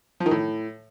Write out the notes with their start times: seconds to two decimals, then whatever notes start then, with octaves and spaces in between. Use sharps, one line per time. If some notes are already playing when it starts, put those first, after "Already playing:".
0.20 F3
0.26 D#3
0.31 A2